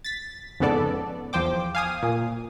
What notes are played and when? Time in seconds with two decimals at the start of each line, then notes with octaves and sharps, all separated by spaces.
0.04 A6 B6
0.60 F2 G#2 C#3 B3 A4 D5
1.33 E2 F3 C5 G5 D6
1.75 F5 G#5 D#6
2.03 A#2